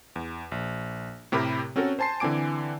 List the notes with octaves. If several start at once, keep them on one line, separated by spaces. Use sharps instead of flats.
E2
A#1
A2 C3 G4 A#4 B5
C4 C#4 F#4 A4 A#4
C5 G#5 A5 C6 C7
D3 E3 C4 G#5 D6 D7